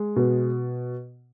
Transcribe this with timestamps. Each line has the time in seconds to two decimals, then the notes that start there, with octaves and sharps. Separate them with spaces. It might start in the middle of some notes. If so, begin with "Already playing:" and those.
Already playing: G#3
0.16 B2